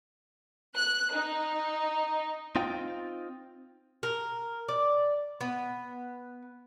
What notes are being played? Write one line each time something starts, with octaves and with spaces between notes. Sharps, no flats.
F#6
D#4
C4 D#4 F4 G5
A#4
D5
B3